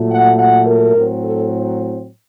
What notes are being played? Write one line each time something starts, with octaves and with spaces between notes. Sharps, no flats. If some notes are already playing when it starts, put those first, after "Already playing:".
Already playing: A#2 F#3 A3
F#5
F#5
A#4
A2 F#3 C4
A4